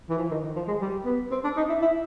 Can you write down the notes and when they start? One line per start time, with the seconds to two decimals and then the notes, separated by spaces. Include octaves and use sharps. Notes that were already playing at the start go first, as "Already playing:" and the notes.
0.10 E3
0.18 F3
0.31 D#3
0.43 D#3
0.56 F3
0.68 G#3
0.81 G3
1.06 B3
1.31 C4
1.44 D4
1.57 D#4
1.69 E4
1.82 E4